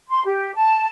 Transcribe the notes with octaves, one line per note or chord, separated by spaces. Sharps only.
C6
G4
A5